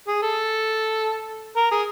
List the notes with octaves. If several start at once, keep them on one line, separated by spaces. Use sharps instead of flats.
G#4
A4
A#4
G#4